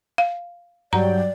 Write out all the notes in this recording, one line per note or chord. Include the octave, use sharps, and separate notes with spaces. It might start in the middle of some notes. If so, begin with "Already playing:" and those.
F5
G2 F#3 D5 G5 A#5